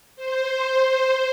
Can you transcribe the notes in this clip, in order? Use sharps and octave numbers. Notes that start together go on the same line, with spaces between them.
C5